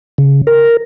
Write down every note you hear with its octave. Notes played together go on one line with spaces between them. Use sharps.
C#3
A#4